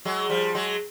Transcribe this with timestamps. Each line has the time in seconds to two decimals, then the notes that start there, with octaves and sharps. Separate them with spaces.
0.05 F#3 G#3
0.30 F3 G3
0.55 F#3 G#3